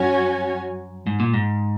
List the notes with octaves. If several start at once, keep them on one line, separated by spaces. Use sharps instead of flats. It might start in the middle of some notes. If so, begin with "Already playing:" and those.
Already playing: F#2 C#4 F#4 C#5 G#5
G#2
A#2
G#2